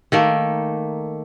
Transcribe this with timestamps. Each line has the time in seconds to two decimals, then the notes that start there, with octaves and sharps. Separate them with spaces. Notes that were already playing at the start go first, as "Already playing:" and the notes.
0.12 D#3 A3 A#3